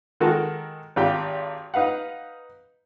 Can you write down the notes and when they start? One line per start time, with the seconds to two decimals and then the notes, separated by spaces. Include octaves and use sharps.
0.20 D#3 G#3 F#4 A4 A#4
0.96 G#1 F4 G4
1.74 D#4 B4 F5 F#5